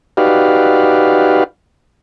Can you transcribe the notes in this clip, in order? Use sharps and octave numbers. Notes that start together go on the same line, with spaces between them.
D#4 F#4 G4 B4 D5 F5